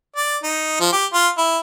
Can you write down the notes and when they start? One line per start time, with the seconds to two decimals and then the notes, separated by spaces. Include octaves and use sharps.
0.16 D5
0.43 D#4
0.80 F3
0.93 G4
1.14 F4
1.38 E4